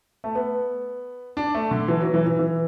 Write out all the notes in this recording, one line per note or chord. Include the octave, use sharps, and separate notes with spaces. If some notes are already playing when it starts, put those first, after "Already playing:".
A3
B3
D4
A3
D3
E3
F#3
E3
E3
E3